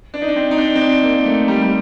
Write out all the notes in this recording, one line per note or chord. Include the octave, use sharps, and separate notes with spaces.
D4
D#4
D4
C4
D#4
D4
C4
D4
A#3
A3
G3
G3